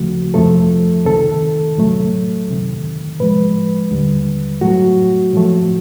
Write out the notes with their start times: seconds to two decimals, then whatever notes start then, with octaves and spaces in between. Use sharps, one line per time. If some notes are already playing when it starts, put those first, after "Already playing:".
Already playing: D2 C#3 F3 A3 F#4
0.34 F2 C3 F3 A3 A4
1.06 C#2 C3 D#3 A4
1.78 A2 F#3 A3
2.48 C#2 C3 D#3
3.20 A2 F3 G#3 B4
3.91 D#2 D3 G3
4.61 A2 F#3 A3 F#4
5.33 A2 F3 A3